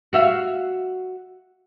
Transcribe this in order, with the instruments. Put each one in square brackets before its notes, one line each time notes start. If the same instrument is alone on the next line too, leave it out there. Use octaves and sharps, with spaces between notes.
[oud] F#4 E5 F5